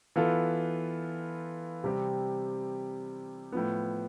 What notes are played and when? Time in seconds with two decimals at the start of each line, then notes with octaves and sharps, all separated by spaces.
0.16 E3 B3 F4 A4
1.84 C3 G3 C4 G4
3.52 A2 F3 B3